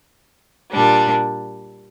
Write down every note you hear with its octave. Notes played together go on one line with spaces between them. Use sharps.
A#2 G3 D4